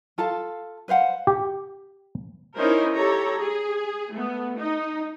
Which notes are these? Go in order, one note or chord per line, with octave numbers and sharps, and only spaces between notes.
F4 A4 F5 A5
B4 C5 F5 F#5
G4
C#4 D#4 E4 A#4 C5
G4 A4 C#5 A#5
G#4
A3 B3
D#4